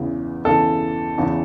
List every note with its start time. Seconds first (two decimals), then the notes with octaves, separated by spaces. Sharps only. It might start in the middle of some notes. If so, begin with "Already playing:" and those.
Already playing: E2 C#3 E3
0.45 E2 C#3 E3 A4
1.18 E2 C#3 E3